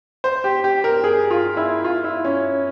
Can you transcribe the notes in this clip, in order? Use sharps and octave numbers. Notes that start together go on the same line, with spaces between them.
C5
G4
G4
A#4
G#4
F4
E4
F4
E4
C#4